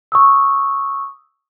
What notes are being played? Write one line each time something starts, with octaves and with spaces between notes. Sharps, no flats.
C#6 D#6 E6